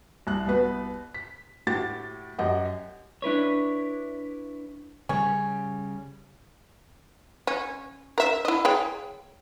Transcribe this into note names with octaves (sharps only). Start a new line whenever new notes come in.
C2 F#6
C2 B3 F#4 B4
B6
A2 F#4 G4 A6
F#2 G4 D#5 F#5
D4 E4 B4 C#5
C#3 G3 C#4
C#4
A#4 E5
E4 D#5
G#4 C#5 G5